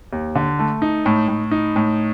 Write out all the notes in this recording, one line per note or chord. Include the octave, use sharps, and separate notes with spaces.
D#2
D3
A3
D#4
A2
A2
D#4
A2